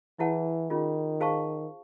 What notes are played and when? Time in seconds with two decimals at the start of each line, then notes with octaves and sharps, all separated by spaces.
0.19 E3 E4 G#4 C#5 F#5 A5
0.70 D#3 C#4 F4 G#4
1.20 G#4 C5 F5 A5 C#6